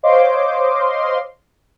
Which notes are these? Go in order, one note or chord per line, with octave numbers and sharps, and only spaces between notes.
C5 C#5 D#5 F5 C6 D6